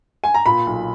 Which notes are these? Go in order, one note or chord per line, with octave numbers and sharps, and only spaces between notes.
G#5
A#5
A#2 B5
B1